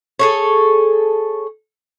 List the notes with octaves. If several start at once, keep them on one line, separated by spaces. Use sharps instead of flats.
G#4 A4 C#5